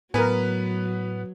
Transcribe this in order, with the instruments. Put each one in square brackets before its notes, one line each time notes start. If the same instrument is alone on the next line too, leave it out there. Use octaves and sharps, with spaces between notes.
[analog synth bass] A2 [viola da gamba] F#3 [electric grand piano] B3 B4 [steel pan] A#4 G#5